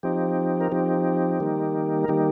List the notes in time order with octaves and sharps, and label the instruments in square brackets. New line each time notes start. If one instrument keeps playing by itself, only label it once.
[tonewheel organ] F3 C4 D#4 G4
A#4
F3 C4 D#4 G4
D#3 G3 A#3 D#4
A#4
D#3 G3 A#3 D#4 G4